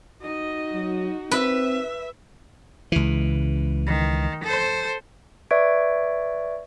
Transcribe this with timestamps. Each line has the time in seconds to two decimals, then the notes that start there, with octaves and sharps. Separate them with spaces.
0.22 D#4 F#4 D#5
0.73 F#3
1.31 C4 B4 E5
2.92 C#2 E3
3.86 D#3
4.44 A4 C5
5.51 B4 D5 E5 C#6 G#6 D7